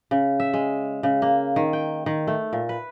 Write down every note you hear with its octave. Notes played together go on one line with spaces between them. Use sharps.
C#3
E5
G#3
C#3
A#3
D#3
G5
D#3
A3
A#2
B4